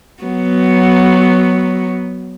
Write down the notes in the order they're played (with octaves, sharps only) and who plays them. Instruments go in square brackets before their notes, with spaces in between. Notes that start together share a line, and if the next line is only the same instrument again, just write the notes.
[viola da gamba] F#3 B3